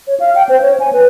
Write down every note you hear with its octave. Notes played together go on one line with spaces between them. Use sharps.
C#5
F5
G5
C5
C#5
G#5
B4